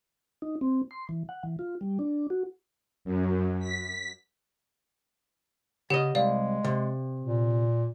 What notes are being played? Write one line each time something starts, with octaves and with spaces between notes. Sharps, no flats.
D#4
C4
C6
E3
F#5
E3
F4
G3
D4
F#4
F#2
B6
C#3 G4 D#5 F#5
C2 G#3 D5 F5
C3
A#2